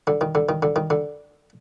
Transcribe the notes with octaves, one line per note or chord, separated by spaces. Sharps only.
D3
D#3
D3
D#3
D3
D#3
D3